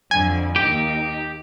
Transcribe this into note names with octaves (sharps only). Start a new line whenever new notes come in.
F2 D3 G#5
D#2 D#4 G4